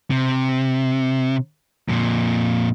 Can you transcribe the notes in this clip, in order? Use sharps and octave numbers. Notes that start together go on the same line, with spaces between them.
C3
F2 A#2